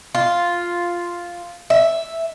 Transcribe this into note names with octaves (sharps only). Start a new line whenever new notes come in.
F4
E5